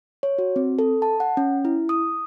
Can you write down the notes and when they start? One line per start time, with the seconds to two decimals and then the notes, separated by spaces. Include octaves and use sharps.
0.23 C#5
0.38 F#4
0.56 C4
0.79 A4
1.02 A5
1.20 F#5
1.37 C#4
1.65 E4
1.89 D#6